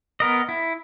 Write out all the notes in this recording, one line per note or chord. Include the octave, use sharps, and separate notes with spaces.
B3 A#4 D#5
E4